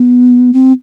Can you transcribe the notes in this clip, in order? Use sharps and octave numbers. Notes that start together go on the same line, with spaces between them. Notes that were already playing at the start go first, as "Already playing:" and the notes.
Already playing: B3
C4